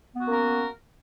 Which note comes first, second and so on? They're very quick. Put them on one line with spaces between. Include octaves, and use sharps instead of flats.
B3 F#4 C#4 A#3 A#4